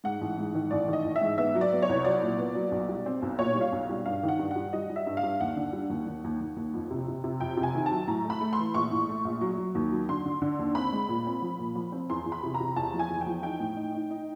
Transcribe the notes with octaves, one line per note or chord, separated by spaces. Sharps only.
G#2 F#5
A1
G#2
D#3
A1 D5
D#3 D#5
A1
E5
G#2
B3 E5
F#3
D5
B3
C#5
C2
F#3 D5
A#2
B3
F#3
B1
G3
C4
B1
A#2 C#5
G3
F5
B1
G3
G2 F5
D#3
F#5
G2
G3 F#5
G3 D#5
G3
E5
G2
F5
G2
D#2 F#5
D3
G3
D#2
D#2
D#2
D#2
D#2
F2
C3
C3
C3
F2 G5
C3
G#5
D#3
F#3 A5
A2 A#5
A3
B5
A3
C6
E3
A#1 C#6
A2
A3
A#1
F#3
F#3
D#2
F#3
D3 C6
D3
D3
D#2
C4 B5
G#3
A#2
C4
F3
A#2
F3
C4
E2 C6
E2
B5
C3
A#5
C3
E2 A5
F3
G#5
E2
G5
F3
D#4 G5
A2
D#4
D#4
D#4